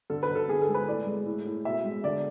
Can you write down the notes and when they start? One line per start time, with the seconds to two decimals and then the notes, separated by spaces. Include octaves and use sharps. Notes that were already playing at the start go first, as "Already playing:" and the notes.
0.10 D3 A4
0.23 B4
0.29 D3
0.35 A4
0.49 D3 G#4
0.62 A4
0.68 G#3
0.74 B4
0.88 A2 D5
1.06 G#3
1.26 A2
1.46 A2
1.65 B2 E5
1.84 G#3
2.03 D3 D5